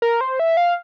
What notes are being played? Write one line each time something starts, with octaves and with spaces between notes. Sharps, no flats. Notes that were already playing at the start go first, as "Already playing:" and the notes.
A#4
C5
E5
F5